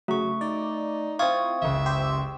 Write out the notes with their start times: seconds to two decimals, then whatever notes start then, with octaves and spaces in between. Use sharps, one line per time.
0.08 C#3 F#3 A3 C#6
0.41 D#4 D5
1.19 C4 E4 F4 C#6 D#6 G#6
1.62 F#1 C#2 E5
1.86 G4 C5 E6